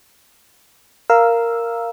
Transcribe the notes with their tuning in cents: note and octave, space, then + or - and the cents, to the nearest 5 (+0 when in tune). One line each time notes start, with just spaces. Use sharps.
A#4 +0 F5 -10 E6 +0